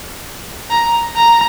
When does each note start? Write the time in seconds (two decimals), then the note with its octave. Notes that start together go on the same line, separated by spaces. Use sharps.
0.70 A#5
1.16 A#5